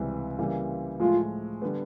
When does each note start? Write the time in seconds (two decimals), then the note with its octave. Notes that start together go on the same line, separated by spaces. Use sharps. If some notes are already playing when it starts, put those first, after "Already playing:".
Already playing: C#2 C3 E3 G3
0.39 C#3 E3 G3 A#3
1.00 A2 F3 G#3 F4
1.62 D3 G3 B3